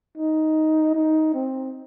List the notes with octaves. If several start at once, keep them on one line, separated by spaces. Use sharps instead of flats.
D#4
D#4
C4